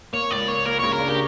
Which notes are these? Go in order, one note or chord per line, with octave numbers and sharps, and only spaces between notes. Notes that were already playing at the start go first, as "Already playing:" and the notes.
A#3 C#5
C#2 D5
A#3 C#5
A#3 A#4
C#3 C#5
A#4
D4
G4